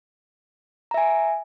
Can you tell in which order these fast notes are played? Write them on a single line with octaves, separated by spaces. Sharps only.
A#5 E5 G#5